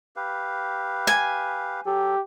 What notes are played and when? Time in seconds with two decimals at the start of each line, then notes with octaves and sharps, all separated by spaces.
0.16 G4 B4 F5
1.07 G#5
1.86 F#3 G4 A4